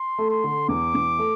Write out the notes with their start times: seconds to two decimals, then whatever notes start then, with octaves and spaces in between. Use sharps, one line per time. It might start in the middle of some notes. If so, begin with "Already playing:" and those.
Already playing: C6
0.18 A3
0.31 C6
0.44 D3
0.68 E2 D6
0.95 E2
1.19 A3